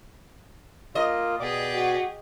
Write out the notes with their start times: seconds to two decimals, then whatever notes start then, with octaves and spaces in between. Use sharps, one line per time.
0.95 A#3 F4 D#5
1.40 B2 G4 G#4 D5 D6
1.73 F#4